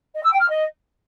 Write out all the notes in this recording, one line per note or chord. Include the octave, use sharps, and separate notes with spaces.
D#5
E6
G5
F6
D#5